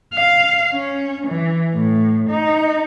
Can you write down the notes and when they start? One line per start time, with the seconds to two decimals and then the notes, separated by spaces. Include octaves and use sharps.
0.14 F5
0.72 C#4
1.27 E3
1.74 A2
2.29 D#4